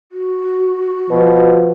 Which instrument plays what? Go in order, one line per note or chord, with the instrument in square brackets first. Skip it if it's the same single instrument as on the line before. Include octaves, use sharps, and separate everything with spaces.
[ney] F#4
[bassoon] B2 [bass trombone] F3